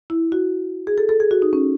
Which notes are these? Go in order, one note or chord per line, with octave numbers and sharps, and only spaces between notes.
E4
F#4
G#4
A4
A4
G#4
F#4
D#4
C#4